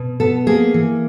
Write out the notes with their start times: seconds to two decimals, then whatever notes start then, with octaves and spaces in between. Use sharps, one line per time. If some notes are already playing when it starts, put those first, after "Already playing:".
Already playing: B2
0.20 B3 A4
0.47 A#3 G#4
0.74 E3